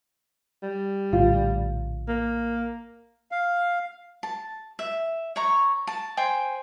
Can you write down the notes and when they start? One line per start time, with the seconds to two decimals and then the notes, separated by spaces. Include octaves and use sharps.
0.63 G3
1.13 A#1 A2 D3 F4
2.08 A#3
3.32 F5
4.23 A5
4.79 E5
5.36 C#5 A#5 C#6
5.87 A5
6.17 C5 G5 G#5